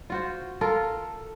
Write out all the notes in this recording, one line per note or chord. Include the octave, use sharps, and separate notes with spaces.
F4 F#4 C5
F4 A4 A#4